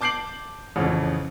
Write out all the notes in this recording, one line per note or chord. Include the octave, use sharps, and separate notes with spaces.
A5 D6 G6 C7 D7 F#7
A1 F2 C#3